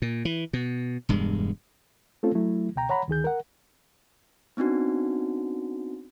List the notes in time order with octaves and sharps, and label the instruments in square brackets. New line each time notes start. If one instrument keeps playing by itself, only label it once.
[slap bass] A#2
E3
B2
E1 G2 G#3
[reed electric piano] A3 C4 C#4 F4 A4
F#3 A3 E4
C#2 B2 G5 A#5
C#5 F#5 A#5 B5
D2 D#3 G#4 G6
A#4 F#5
[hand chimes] B3 C4 D4 D#4 F#4